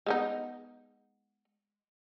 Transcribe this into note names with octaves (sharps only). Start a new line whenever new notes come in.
G#3 B3 D#4